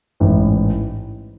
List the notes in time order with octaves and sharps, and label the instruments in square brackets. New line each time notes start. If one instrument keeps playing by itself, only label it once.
[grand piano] A1 G#2 E3